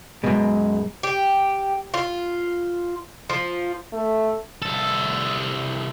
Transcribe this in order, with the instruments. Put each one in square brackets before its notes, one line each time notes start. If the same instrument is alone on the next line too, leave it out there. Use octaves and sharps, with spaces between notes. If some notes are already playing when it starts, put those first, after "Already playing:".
[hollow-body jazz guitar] F#2 B2 [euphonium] G#3
[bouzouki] G4
F4
F3
[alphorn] A3
[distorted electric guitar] C2 A4